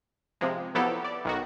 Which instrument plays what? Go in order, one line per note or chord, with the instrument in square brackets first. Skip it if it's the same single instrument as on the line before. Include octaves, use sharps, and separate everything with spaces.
[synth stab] C3 F3 G#3
F3 F#3 B3 E4 G4 A4
D5
B1 D#3 F#4